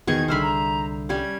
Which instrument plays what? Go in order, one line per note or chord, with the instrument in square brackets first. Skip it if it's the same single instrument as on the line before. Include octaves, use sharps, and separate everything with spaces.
[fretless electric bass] E2 B2 [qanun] D#3 G#4 C#6 [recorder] G#6
[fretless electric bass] C2 D3 [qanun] C5 E5 B5 [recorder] F6
[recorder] A#5
[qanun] G3 C#4 [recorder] G#6